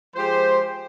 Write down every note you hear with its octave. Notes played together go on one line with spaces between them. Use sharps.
F3 G#3 G4 C5